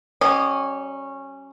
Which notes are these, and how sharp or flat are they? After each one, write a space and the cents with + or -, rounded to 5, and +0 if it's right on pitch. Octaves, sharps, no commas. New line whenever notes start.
G3 -45 C#4 -15 D#5 -25